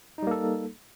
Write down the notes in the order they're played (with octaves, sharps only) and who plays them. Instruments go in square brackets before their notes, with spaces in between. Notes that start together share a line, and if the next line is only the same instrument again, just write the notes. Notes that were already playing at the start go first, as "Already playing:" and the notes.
[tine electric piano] D#4
G3
A#3
A4